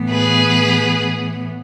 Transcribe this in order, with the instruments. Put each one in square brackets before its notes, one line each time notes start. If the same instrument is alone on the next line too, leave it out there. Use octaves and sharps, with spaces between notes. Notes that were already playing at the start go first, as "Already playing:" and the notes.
Already playing: [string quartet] A2 E3 B3
G#4 B4